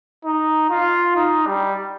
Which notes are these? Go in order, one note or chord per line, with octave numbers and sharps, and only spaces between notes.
D#4
F4
D#4
G3